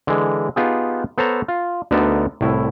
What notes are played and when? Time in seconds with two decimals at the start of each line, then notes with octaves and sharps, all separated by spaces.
0.07 D3 E3 G#3
0.56 B3 D#4 F4 G4 G#4
1.18 B3 A4 C5 C#5 A#5
1.48 F4
1.91 D2 D3 B3 D#4 A#4 A5
2.41 C2 A2 E4